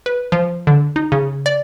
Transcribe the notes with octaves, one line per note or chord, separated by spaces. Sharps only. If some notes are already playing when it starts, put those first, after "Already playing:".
B4
F3
D3
D#4
C#3
D5